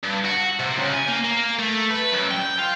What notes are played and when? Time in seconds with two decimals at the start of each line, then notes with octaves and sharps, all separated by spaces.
0.04 G2
0.25 F#4
0.60 C3
0.79 C#2
0.94 G#5
1.08 A#3
1.24 A#3
1.59 A3
1.91 B4
2.13 F#2
2.31 G5
2.58 F4